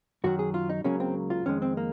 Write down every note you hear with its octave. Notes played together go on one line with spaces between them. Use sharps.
F#2 D#3 F#3 F#4
G#4
F4
D#4
C#2 C#3 F#3 A#3 C#4
C4
F4
F2 D#3 G#3 C#4
C4
A#3